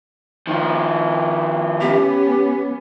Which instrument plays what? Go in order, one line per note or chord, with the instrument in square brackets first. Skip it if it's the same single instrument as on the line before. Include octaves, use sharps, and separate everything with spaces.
[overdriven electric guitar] D#3 F3
[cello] B3 C#4 [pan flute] G4